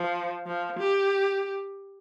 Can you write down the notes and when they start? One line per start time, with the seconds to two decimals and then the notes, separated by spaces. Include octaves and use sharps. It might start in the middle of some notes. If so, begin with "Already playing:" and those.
Already playing: F3
0.46 F3
0.79 G4